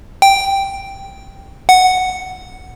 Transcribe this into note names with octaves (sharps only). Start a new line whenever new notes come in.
G5
F#5